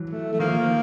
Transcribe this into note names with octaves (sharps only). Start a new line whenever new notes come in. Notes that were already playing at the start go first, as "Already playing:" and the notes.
Already playing: E3 F#3
A3
A3
D#3 F3 A#3
F3